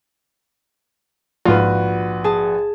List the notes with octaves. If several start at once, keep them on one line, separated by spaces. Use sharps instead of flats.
A#1 G#2 F4 F#4 B4
G#4 A5